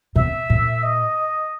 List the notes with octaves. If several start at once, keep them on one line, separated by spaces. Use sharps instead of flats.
B2 E5
A#2
D#5